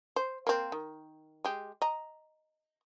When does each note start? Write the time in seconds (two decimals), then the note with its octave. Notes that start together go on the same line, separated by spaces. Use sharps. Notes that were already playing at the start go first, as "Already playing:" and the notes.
0.16 C5
0.47 A#3 C4
0.72 D#3
1.45 G#3 G4
1.82 D#5 A#5